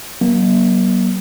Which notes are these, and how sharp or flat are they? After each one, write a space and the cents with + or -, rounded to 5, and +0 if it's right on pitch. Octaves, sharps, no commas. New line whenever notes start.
F#3 +30 A#3 +40